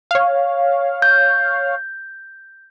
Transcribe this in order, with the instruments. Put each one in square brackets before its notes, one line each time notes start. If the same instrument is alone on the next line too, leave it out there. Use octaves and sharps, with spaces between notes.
[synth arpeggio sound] C#5 F5
[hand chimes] G6